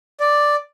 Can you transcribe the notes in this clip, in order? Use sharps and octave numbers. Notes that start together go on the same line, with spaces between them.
D5